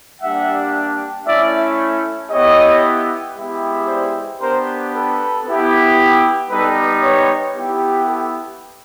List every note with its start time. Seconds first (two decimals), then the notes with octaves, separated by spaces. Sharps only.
0.21 G3 A#3 D4 G4 E5 F#5
1.26 A3 C#4 E4 D5 E5
2.31 B3 E4 G4 C#5 D#5
3.36 G#3 B3 E4 G4
3.88 C5 D5
4.40 B3 D4 G4 A#4 C5
4.93 A4 B4
5.46 B3 E4 G4
6.50 G3 B3 D#4 G4 A4 B4
7.03 B4 C#5
7.55 B3 E4 G4
8.07 G4 A4